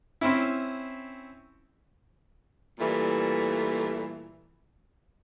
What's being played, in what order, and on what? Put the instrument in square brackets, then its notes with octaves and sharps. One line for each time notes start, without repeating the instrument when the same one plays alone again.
[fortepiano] C4 C#4 E4
[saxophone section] A#2 E3 G3 A3